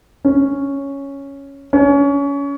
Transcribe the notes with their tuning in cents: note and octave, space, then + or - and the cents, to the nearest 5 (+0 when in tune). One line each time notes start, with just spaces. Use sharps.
C#4 +0
C#4 +25